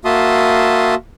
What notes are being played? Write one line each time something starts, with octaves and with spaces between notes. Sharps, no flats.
A#3 F#4 E5 A5 C6 D#6